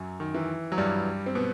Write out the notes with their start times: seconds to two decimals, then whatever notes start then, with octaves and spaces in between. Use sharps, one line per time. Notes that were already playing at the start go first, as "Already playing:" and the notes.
Already playing: F#2 F#3
0.20 D#3
0.34 E3
0.72 F#3
0.78 G2 G3
1.26 C4
1.35 B2 B3